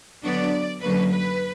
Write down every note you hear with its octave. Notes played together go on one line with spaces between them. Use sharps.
D3 F#3 B3 D4 D5
F#2 D3 F#3 A#3 B4
B4